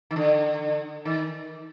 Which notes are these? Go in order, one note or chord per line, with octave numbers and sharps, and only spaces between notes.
D#3
D3
D#3